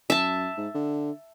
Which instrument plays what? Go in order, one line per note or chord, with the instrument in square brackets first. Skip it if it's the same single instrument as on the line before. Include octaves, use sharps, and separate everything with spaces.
[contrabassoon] F#2 [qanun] E5 A5
[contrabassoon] G#2
D3